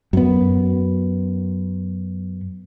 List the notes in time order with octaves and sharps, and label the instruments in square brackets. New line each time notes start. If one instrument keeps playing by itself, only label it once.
[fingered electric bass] F#2 B3